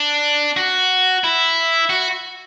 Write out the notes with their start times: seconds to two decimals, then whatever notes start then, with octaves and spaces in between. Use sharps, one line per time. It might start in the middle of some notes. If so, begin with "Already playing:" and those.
Already playing: D4
0.57 F#4
1.24 E4
1.90 F#4